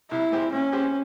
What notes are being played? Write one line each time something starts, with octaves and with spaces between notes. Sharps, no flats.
C2 E4
A#2 G#3 C4 G4
A#2 C#4
G#3 C4 G4 C5